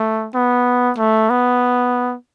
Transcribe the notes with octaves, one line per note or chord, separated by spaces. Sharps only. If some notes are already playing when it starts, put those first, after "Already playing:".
Already playing: A3
B3
A3
B3